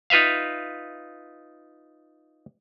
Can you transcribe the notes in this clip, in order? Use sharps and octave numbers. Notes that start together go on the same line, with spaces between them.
D#4 F4 B4 E5 F5